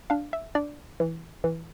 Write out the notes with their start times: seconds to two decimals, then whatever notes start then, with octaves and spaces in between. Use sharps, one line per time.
0.10 D4 F5
0.33 E5
0.55 D4 D5
1.00 E3
1.44 E3